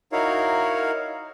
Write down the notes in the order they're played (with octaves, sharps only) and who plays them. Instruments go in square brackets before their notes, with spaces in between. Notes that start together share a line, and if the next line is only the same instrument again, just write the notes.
[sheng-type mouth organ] D#4 E4 F#4 A#4 C#5 F5